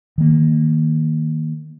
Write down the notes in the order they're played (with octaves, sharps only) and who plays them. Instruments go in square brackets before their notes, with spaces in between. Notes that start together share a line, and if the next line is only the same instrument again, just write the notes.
[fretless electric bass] D#3 A#3